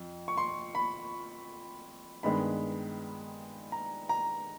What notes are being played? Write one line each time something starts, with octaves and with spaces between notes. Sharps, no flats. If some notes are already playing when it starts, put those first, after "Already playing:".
Already playing: F2
C#6
C6
B5
G2 D#3 G#3 B3 B5
A#5
A#5